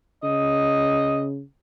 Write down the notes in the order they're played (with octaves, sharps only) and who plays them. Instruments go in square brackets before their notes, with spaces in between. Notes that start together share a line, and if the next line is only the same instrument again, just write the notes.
[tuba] C#3 [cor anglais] D#5